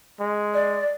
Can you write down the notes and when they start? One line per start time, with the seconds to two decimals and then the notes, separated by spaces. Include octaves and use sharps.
0.20 G#3
0.54 D5